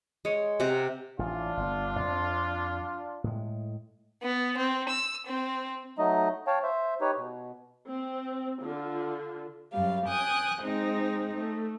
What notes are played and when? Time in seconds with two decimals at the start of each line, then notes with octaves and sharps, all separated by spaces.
0.25 G#3 C#5
0.60 C3 G4 F#5 A#5
1.19 A1 F3 D4 F4
1.57 G1 C3 B3
1.99 F2
3.24 A2 G#3
4.23 B3
4.57 C4
4.89 E6
5.27 C4
5.98 F#3 A3 D#4 D#5
6.47 C#5 F5 G5 A5
6.63 C5 E5
7.01 D#4 G4 B4 C#5
7.18 B2
7.90 C4
8.62 D3 F4
9.72 F#2 G3 F5
10.07 G5 G#5 D#6 F#6
10.63 G#3 C4 D#4
11.38 A3